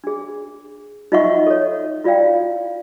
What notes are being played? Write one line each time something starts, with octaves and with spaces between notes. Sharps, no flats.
D4 G#4
D#4 F4 D#5 E5 F#5 C#6
A4 C#5
E4 F4 D5 F5 G5